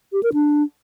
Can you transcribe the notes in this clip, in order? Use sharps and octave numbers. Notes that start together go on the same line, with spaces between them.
G4
A#4
D4